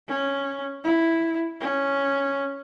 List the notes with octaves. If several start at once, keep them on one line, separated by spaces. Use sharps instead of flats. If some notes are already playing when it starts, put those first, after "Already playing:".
C#4
E4
C#4